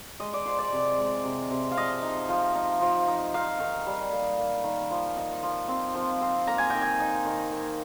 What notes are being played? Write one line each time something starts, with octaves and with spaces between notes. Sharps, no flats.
G#3 D#5
D5
F3 C5
D5
C3
G#3
C3
C3
F5
F3 D#5
D#4
F3
D#4
F3
D#4
D#4 F5
D#3
G3
A#3
A#3
D#3
F3
D#4
F3
C4
F3
C4
A#3 A#5
G#5
D#3 G5
G#5
D#4
D#3
A#3